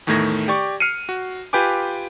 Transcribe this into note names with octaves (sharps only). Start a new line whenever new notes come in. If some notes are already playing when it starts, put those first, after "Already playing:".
E2 A2 D#3 A3 G#6 A#6
G4 D5 C#6
F6 C7 C#7 D#7
F#4
F4 G4 B4 G5 G#5 D6